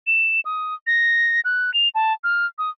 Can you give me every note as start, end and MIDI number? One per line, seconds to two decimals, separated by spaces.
0.07 0.40 100
0.45 0.74 87
0.87 1.40 94
1.45 1.73 90
1.74 1.89 101
1.95 2.13 81
2.24 2.46 89
2.58 2.70 87